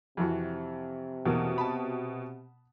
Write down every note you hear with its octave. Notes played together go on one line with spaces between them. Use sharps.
F2 C3 E3 F#4
E2 B2 A#3
A5 B5